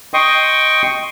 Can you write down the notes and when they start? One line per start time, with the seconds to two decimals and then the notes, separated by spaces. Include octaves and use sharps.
0.14 D#5 G5 C6 C#6 D#6